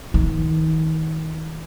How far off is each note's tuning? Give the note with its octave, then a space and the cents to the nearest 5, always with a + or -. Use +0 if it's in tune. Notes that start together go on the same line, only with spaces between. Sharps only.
D#3 +35